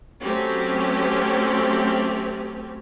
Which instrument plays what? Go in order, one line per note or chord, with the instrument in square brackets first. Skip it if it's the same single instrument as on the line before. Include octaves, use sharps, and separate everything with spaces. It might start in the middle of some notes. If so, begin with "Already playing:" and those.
[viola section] F#3 A3 C4 C#4 G4